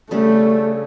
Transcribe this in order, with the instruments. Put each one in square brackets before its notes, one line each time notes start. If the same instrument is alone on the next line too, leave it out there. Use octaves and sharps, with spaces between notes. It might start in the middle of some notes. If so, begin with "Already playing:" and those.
[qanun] C#3 G3 D4 [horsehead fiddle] A3